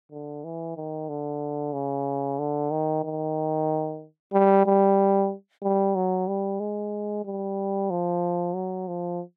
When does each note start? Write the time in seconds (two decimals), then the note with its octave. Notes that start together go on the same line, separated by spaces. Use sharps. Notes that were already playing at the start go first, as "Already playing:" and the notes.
0.11 D3
0.44 E3
0.76 D#3
1.09 D3
1.73 C#3
2.39 D3
2.71 D#3
3.04 D#3
4.33 G3
4.66 G3
5.63 G3
5.95 F#3
6.27 G3
6.60 G#3
7.25 G3
7.90 F3
8.55 F#3
8.88 F3